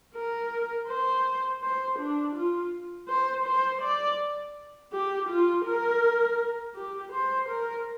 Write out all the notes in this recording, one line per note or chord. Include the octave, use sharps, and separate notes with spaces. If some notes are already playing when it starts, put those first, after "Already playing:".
A#4
C5
C5
D4
F4
C5
C5
D5
G4
F4
A#4
G4
C5
A#4